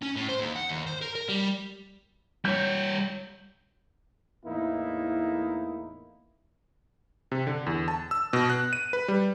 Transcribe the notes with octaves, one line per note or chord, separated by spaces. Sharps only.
C#4
A2
C5
D#2
F#5
D#2
C5
A#4
A#4
G3
G3 C#5 G6
E2 A2 A#3 D#4 E4
C3
D3
E2
A5
E6
B2
F#6
D#7
B4
G3